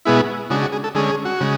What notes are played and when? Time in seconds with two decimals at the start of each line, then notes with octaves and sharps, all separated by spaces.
0.05 B2 G#3 B3 E4 G#4
0.50 C#3 G#3 D4 F#4
0.62 F#4
0.72 G#4
0.84 A4
0.95 D3 G#3 C#4 G#4
1.10 G#4
1.25 F#4
1.40 C#3 G#3